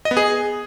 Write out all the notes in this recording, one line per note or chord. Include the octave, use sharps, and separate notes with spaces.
D#5
B3
G#4